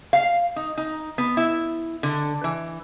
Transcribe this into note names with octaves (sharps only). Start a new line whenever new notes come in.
F5
D#4
D#4
B3
E4
D3
E3